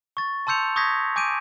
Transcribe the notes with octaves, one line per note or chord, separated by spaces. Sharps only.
C#6 A6
A5 C6 E6 G6 C#7 F7
C#6 D#6 G6 G#6 A#6 B6
G#5 D6 G6 D7 D#7